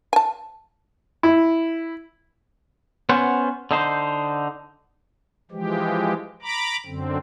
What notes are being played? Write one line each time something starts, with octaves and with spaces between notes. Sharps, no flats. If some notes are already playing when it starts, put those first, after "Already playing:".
G#5 A5
E4
B3 C#4 C5 F#5
D3 D#4 C5
E3 F3 G#3 G4
A#5 B5 D6
F#2 D3 C4